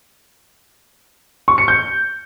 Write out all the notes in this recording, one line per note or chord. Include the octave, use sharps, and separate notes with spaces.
C#6
C#7
G6